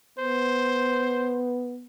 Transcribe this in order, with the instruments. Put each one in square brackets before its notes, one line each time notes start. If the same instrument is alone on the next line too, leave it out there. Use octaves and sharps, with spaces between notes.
[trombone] B3 [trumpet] C5